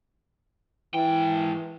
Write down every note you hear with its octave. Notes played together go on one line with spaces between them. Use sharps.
G#2 E3 G5